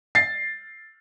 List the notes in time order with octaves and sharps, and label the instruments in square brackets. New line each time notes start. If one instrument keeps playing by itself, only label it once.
[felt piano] A6 C7